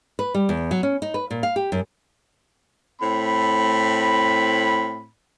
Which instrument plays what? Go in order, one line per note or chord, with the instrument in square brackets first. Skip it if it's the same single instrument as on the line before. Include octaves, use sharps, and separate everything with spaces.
[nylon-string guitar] B4
G3
E2
F#3
C#4
D#4
B4
A#2
F5
G4
F#2
[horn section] A2 C4 B5